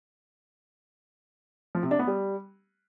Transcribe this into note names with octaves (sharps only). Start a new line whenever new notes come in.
F3
C3
D4
B3
G3